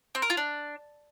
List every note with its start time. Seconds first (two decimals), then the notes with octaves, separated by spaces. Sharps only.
0.15 C4
0.22 A#4
0.30 F4
0.37 D4